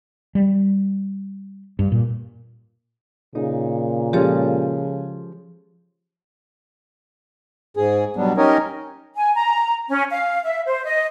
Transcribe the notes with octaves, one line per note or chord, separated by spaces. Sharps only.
G3
G2
A#2
A#2 C#3 D#4
F3 G#3 C#4 G4 A4 C#5
G#2 G#4
B2 F#3 G3 B3 D4
C#4 D#4 G4 A#4 C#5 D#5
G#5
A#5
C#4
F5
E5
C5
D#5